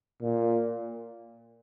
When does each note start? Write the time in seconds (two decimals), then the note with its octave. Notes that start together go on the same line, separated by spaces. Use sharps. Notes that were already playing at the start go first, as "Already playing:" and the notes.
0.22 A#2